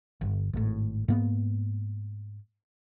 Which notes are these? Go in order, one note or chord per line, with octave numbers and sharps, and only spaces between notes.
G1
G#1 A2
G#2 A#3 B3